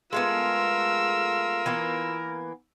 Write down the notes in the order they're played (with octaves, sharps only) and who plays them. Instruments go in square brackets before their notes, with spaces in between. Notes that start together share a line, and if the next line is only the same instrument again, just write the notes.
[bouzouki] G#3 A3 B3 [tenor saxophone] F4 [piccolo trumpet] A#4 [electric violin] E6
[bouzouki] E3 A#3 B3